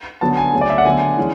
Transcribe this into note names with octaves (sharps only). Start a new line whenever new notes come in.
D3 F#3 B3 A5
G#5
C#3 F#3 A3
D5
E5
F#5
D3 F#3 B3 G#5
E3 G#3 C#4